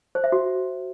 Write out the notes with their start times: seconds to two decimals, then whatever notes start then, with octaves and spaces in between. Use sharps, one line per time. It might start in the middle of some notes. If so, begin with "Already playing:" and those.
0.15 C5
0.24 E5
0.32 F#4